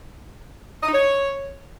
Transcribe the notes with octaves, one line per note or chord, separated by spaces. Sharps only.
D#5
D#4
C#5